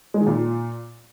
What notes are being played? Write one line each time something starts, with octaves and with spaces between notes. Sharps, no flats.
G#3
D#3
A#2